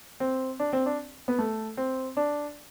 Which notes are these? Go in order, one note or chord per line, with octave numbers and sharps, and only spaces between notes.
C4
D4
C4
D4
B3
A3
C4
D4